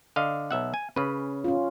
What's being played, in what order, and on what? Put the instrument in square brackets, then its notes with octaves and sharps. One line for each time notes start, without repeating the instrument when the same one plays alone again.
[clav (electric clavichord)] D3 D#5 F5
B1 E5 F#5
G#5
[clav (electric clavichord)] C#3 B4 [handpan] C#4
[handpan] C#4 F4